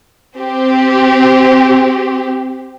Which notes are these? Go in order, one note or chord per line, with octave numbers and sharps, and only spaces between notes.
C4 G4